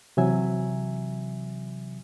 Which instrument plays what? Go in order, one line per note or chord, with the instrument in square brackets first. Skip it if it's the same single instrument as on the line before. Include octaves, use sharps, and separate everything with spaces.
[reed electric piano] C3 E3 F#3 E5 G#5